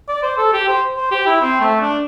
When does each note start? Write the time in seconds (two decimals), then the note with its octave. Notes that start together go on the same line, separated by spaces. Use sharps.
0.09 D5
0.23 C5
0.38 A4
0.53 G4
0.68 C5
0.97 C5
1.12 G4
1.26 E4
1.41 C4
1.61 A3
1.81 D4